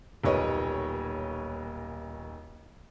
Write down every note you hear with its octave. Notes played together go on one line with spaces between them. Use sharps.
D#1 B1 A#3 B4 C#5 D#5